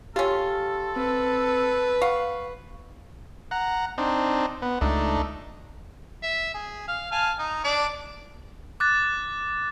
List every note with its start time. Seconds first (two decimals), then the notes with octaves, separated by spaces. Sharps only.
0.16 C#4 F4 G4 A4
0.96 C4 B4
2.02 F5 F#5 C#6
3.51 F#5 A#5
3.98 C4 D4 D#4
4.62 B3
4.81 C#2 A3 D4 D#4
6.23 E5
6.54 G#4
6.88 F5
7.12 F5 G#5 A5
7.39 D#4
7.64 D4 D5
8.80 D6 F#6 A6